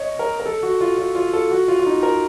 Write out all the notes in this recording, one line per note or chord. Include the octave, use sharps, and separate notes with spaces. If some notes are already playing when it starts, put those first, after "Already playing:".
Already playing: C#5 D#5
A#4
A#4
A4
F#4
F4
F4
F4
A4
F#4
F4
F4
D#4
A#4